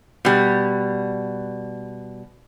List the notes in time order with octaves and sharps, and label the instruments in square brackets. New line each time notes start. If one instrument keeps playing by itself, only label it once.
[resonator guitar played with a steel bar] B2 G3